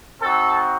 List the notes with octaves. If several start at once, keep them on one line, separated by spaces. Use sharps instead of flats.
C4 D#4 F#4 A4